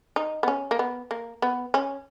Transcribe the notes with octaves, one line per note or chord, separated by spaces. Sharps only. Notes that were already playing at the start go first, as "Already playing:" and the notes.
D#4
B3
C#4
A#3
B3
A#3
B3
C#4